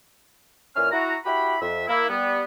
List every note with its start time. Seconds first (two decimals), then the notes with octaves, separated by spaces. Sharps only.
0.76 A#2 E3 C#4 F6
0.92 E4 F#4 A#5
1.26 E4 F#4 G4 B5
1.61 F2 E5
1.88 A#3 E4
2.09 G3 B3